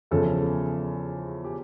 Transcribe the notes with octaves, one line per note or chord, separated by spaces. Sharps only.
E2 C#3 F3 A4
G4